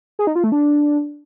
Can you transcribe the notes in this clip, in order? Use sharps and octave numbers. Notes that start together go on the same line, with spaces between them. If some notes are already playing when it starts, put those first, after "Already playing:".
G#4
D#4
F4
A3
D4